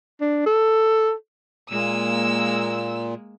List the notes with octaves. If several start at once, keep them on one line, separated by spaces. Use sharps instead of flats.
D4
A4
A#2 G#3 A#3 E6